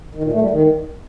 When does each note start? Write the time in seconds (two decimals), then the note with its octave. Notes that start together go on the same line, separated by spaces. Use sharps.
0.15 D#3
0.24 A#2
0.33 A3
0.41 G3
0.50 D#3